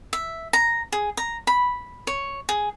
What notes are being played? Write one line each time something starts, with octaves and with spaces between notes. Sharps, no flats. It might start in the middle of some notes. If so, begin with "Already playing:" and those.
E5
A#5
G#4
A#5
B5
C#5
G#4